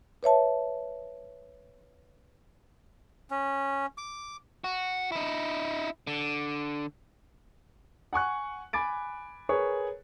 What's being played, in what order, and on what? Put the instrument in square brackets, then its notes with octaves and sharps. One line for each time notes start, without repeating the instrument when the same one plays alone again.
[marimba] B4 C#5 E5 A5
[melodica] C#4
D6
[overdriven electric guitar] F#4
D#4 E4
D3
[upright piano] F#5 G#5 C#6 F#6
G#5 B5 D6 A6 D7
G#4 A#4 B4 C#5 C#6